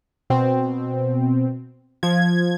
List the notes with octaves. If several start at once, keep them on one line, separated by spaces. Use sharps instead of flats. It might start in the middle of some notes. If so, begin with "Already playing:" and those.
B2 C4
F3 G#6